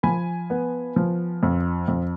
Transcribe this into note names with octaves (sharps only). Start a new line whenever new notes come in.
F3 G#5 B5
B3
F3
F2
F2